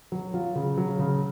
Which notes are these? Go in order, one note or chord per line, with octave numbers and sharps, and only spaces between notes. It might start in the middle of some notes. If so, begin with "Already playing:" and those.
F#3
F#3 F4
C#3
F#3
C#3